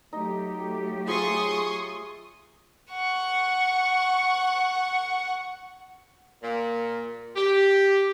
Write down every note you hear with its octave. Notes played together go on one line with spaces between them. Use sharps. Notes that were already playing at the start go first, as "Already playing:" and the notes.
F#3 A3 D#4 G4
F4 G#4 C#5 E5 C6 C#6 D#6
F#5 C#6
A#2
G4